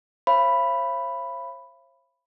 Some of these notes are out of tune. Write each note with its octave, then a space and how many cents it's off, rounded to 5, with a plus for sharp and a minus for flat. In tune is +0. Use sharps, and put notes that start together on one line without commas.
C5 +45 F5 -45 B5 +0